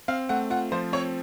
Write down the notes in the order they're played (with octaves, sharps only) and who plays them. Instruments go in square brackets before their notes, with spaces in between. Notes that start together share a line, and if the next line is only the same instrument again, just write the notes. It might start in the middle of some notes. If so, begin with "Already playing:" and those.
[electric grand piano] C4 [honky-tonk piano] F5
[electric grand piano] A3 [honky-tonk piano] F#5
[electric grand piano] F4 [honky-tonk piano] F#5
[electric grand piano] F3 [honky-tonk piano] C5
[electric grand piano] C4 [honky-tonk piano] C#5